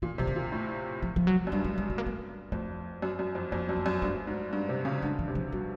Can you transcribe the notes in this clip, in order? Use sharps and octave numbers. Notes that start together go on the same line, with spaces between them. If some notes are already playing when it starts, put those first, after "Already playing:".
A#2 E3
C3 E3
D#3
A#2
A2
F3
F3
F#3
F#2
G2 G3
G#3
G#3
A3
A#3
A3
F2 A3
F#2
F#2
F2
F2 A#3
F#2
A3
F#2
G2 A3
G#2
G2
C3
C#3
D3 G#3
E3
C3
F3
B2 G3